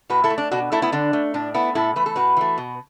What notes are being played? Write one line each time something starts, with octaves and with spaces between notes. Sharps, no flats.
A2 F#4 B4
E4 A4
A3
D4
B2 D4 F#4
A3 E4 A4
B3 E4
D3 D4
A3
A2 D4
A3 B3 E4
A2 E4 A4
E3 A3 B4
A4
A2 F#4 B4
E3 A3
B2